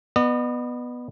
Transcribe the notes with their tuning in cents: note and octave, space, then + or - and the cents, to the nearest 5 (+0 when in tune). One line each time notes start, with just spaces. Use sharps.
B3 +0 D#5 -45